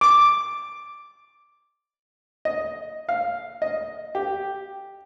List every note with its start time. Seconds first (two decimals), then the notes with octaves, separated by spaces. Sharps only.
0.01 D6
2.45 D#5
3.09 F5
3.62 D#5
4.15 G4